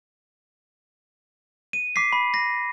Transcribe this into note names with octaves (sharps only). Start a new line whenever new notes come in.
D#7
D6 B6 C7
B5
A#6